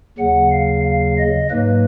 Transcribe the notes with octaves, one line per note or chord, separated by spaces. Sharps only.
D#2 C#3 F#3 F#5
F5
F5
D#5
G#2 F#3 A#3 B4